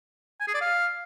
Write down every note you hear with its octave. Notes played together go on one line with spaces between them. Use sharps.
G#5
G#4
D5
F5